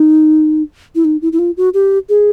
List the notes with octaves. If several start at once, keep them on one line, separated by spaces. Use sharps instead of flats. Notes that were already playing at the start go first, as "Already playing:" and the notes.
Already playing: D#4
E4
D#4
E4
E4
F4
F#4
G4
G#4